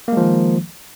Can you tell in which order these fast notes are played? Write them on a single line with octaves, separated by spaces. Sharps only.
A#3 G#3 F3 D#3